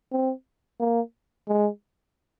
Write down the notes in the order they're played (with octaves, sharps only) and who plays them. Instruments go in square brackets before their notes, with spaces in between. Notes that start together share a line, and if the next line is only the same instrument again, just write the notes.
[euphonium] C4
A#3
G#3